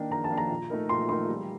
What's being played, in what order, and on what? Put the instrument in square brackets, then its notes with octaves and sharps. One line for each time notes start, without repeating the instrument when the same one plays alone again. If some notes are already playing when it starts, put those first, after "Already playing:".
Already playing: [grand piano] D#3 A#3 D4 [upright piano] G5
[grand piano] D#3 [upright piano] A#5
[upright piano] A5
[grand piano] A#3 D4
[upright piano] A#5
[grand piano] A#2
A3 D#4 A#4
[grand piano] A#2 [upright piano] C6
[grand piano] A3 D#4 A#4 [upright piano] C6
[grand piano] G3